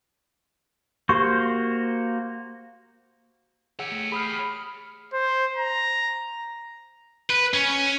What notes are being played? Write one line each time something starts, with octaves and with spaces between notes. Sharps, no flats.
A#3 F#4 G4 C5 C#6
G4 G#4 C#5 F#5 E6
A3
G#4 B5 D#6 F6 C7
C5
A#5
B4
C#4